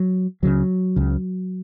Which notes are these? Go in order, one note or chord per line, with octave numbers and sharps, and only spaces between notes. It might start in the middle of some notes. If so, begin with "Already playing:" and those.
Already playing: F#3
C#2 C#3 F#3
C#2 C#3